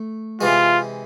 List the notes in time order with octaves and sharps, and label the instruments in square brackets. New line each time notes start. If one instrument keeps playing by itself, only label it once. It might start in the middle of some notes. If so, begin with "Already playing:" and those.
Already playing: [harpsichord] A3
[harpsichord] C3 E3 G#3 [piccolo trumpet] F4